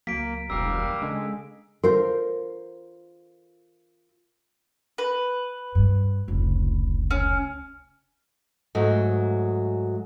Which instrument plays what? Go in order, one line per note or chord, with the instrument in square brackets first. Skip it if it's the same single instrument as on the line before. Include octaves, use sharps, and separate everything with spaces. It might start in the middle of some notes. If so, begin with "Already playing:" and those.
[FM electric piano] C#2 F#3 [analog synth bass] A#3 [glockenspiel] B6 D7
[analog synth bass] E1 [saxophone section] G3 A#3 [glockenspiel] E6
[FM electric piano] C#3 D4 A4 [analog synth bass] G#3
[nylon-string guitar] F4 A#4 C5
[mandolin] B4
[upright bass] G2
F1 C#2
[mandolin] C#4
[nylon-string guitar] G#2 F#3 A3